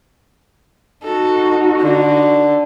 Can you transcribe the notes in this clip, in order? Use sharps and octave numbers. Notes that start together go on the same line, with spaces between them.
D#4 F#4 A4
D3